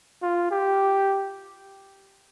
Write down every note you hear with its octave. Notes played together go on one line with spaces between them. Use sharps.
F4
G4